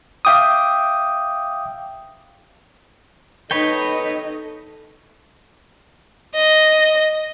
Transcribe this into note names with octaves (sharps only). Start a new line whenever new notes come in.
E5 F5 G5 D6 D#6
D#4 A4 B4 C#5 D#5 G5
D#5